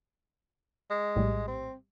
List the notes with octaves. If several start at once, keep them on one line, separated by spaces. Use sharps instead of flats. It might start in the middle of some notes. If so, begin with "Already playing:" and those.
G#3
A#1 A2 G3
C4